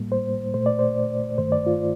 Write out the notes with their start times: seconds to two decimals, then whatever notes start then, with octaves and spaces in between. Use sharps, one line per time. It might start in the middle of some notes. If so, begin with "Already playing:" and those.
Already playing: A2 G3 A#3
0.12 C5
0.54 A#2 A3 C5
0.66 D5
0.79 C5
1.38 G2 D#3 A3 C5
1.52 D5
1.66 F4